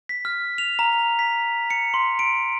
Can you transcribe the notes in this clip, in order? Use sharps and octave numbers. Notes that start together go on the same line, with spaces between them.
B6
F6
F7
A#5
B6
C#7
C6
D7